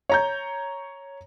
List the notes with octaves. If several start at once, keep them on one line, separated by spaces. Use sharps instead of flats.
C#5 A#5 G6